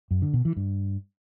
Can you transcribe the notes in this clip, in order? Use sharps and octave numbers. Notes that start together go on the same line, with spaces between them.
F#2
D3
B2
E3
G2